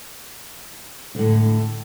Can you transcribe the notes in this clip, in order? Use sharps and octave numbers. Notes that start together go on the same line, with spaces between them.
A2 D3